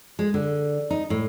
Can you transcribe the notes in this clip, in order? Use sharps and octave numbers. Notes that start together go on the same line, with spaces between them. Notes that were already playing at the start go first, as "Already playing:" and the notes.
G#3
D3
D#4
A2